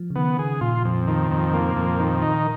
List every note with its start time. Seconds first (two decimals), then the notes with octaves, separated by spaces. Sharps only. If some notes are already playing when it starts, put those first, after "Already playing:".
Already playing: F3
0.10 C#3
0.15 D#3 B3
0.39 C#3 G#4
0.61 A#2 F4
0.85 F2
1.07 D#3
1.31 F2
1.53 A#3
1.76 F2
1.99 D#3
2.22 D#4